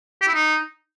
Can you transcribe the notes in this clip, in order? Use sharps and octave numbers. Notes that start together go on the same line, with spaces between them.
G4
E4
D#4